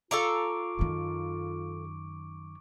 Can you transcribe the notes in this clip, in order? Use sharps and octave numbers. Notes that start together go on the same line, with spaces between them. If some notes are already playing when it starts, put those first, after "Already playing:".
F4 A4 F5 A#5 C#6 D6 D7
F#2 D#3